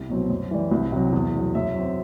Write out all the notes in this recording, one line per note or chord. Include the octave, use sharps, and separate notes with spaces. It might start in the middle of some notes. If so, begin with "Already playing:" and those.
Already playing: C2 D#5
B2 F#3 C4
F#2
E3 G3
C2
C3 F#3
E2
B2 F#3
F#2 E5
F#3 C4